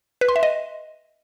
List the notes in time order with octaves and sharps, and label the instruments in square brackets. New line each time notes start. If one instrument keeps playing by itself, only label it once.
[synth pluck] B4
C6
E5
D#5